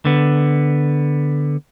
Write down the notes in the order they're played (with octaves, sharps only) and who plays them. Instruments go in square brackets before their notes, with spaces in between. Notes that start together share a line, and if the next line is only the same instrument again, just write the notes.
[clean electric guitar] D3 B3